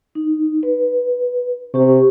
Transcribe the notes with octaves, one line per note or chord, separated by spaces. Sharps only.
D#4
B4
C3 G4 C#6